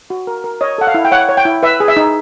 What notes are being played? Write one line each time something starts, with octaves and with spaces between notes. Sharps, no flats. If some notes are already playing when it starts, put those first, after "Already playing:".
F#4
A#4
A#4
C#5 D#5
A4 F#5
F5
E4
G5
C#5 F#5
C#5
G5
E4
B4 E5
G#4
E5
D#4